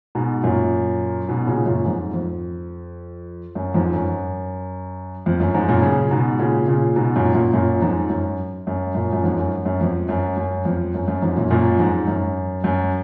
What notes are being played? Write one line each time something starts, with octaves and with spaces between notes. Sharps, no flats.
G#2 B2
F#2 A#2
G#2 B2
A#2 C#3
F#2 A#2
F2 G#2
F2
F#2
F2 G#2
F#2
F2
F#2
F2 G#2
F#2 A#2
A#2 C#3
G#2 B2
A#2 C#3
A#2 C#3
G#2 B2
F#2 A#2
F#2 A#2
F#2 A#2
F2 G#2
F#2
F#2
F#2 A#2
F#2
F2 G#2
F#2
F#2
F2
F#2
F#2
F2
F#2
F#2
F2 G#2
F#2 A#2
F#2 A#2
F2 G#2
F#2
F#2